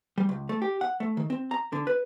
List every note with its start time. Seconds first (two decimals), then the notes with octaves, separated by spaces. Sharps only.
0.18 G3
0.29 C#2
0.49 A3
0.62 G4
0.81 F#5
1.00 A3
1.17 D#3
1.30 C4
1.51 A#5
1.73 D3
1.87 B4